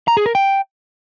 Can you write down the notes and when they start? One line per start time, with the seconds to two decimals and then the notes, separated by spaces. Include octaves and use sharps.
0.08 A#5
0.17 G#4
0.26 A#4
0.35 G5